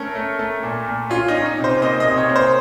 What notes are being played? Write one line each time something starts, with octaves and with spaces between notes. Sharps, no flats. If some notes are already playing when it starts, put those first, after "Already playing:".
Already playing: A3 C#4 A4 A#4
A3
A3
A#2
A#2
C#4 F4
D#4
C#4
D#4
C3
C5
A#3 D#5
D#5
C3
C#5
A#3
C5